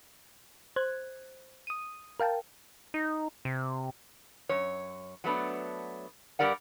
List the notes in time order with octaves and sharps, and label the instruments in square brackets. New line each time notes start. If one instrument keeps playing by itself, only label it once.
[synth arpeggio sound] C5 F#6 G#6
D#6 D#7
A#4 F5 G5 A5
[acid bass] D#4
C3
[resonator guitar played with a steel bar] F#2 C#5
F#3 A3 B3 D4
G2 A3 G4 A#4 D5 F#5